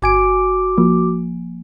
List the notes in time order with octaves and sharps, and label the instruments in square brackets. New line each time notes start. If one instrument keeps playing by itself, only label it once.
[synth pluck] G1 G#5 D7 [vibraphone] F#4 D6
[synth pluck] F3 A#3